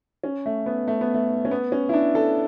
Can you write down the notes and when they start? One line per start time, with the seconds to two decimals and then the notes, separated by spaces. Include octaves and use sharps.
0.23 C#4
0.46 A3
0.66 B3
0.88 A3
1.01 B3
1.14 A3
1.45 C#4
1.51 B3
1.72 C#4
1.89 E4
1.93 D4
2.15 A4